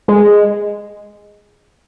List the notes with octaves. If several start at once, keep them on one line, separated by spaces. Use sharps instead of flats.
G#3